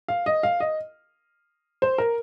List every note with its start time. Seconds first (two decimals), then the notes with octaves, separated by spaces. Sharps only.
0.08 F5
0.26 D#5
0.43 F5
0.60 D#5
1.82 C5
1.98 A#4